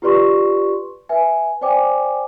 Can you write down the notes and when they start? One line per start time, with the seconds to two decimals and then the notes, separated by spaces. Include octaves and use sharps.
0.02 F4 G4 B4 D5 C6 C#6
1.09 B4 E5 G#5
1.61 C5 D5 G5 G#5 D6